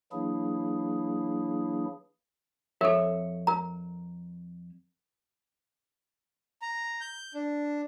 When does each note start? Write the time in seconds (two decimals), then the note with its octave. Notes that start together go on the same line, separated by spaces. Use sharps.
0.12 E3 F#3 A#3 D4 E4 G#4
2.81 F2 A4 A#4 C#5 E5
3.47 A#4 A#5
6.62 A#5
7.01 G6
7.34 D4